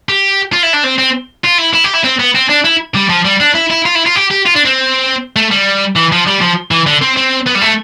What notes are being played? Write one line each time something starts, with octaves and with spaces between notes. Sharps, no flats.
G4
F4
E4
D4
C4
C4
F4
E4
E4
G4
E4
C4
B3
C4
D4
E4
G3
F3
G3
D4
E4
E4
F4
E4
F4
G4
G4
F4
D4
C4
A3
G3
E3
F3
G3
F3
E3
D3
C4
C4
B3
G3
A3